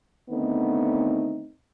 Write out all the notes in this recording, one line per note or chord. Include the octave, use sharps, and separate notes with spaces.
D3 D#3 A3 B3 C4 D#4